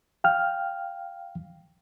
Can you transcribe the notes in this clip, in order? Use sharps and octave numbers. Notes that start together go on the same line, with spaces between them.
F5 G5 F6